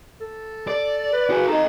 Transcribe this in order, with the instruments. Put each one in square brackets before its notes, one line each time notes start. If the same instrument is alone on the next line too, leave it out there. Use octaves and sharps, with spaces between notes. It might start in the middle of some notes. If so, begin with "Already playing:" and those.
[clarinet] A4
[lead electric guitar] D5
[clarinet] B4
[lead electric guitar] F#4 G#4
[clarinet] D#4 [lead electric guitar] A4 D#5